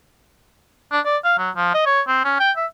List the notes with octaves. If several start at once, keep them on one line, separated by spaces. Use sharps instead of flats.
D4
D5
F5
F#3
F3
D#5
C#5
C4
C#4
G5
E5